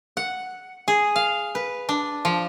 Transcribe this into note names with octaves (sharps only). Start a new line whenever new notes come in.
F#5
G#4
F5
B4
D4
F3